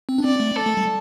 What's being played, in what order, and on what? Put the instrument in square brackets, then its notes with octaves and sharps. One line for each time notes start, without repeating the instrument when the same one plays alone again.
[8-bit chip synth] C4
D4
[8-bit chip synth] C4 [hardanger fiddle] D5
[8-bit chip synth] A3
[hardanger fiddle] A4
[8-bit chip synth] A3
G3